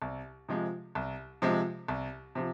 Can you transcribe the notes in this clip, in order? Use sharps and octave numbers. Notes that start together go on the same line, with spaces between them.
C2
C3 F3 G#3
C2
C3 F3 G#3
C2
C3 F3